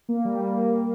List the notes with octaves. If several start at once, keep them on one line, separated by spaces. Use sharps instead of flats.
A#3
G3
A#3
A#3